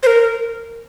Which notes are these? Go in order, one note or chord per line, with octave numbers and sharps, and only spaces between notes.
C5
A#4